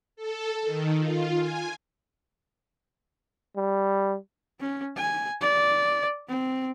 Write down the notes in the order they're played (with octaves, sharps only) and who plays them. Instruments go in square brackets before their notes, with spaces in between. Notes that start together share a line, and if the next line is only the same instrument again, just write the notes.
[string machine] A4
D#3
F4
G#5
[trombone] G3
[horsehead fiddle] C#4
G#5
D5
C4